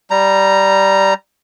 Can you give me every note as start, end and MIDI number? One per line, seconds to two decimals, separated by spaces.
0.10 1.14 55
0.10 1.14 82